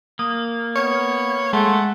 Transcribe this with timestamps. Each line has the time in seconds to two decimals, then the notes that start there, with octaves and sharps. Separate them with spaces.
0.19 A#3 D#6
0.76 B3 C#5
1.53 G#3 A3 F#5 C6 G7